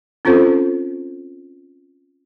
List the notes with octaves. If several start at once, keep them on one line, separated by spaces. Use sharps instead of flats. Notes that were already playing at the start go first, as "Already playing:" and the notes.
C4 C#4 F4 A4 C5